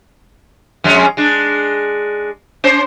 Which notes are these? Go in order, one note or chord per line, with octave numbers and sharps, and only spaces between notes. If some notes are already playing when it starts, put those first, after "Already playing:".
F2 G#3 C#4
G#3 D4
C#4 C5